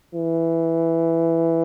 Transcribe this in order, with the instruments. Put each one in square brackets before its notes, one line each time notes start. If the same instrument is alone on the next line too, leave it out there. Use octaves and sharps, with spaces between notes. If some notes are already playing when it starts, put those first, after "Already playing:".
[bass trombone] E3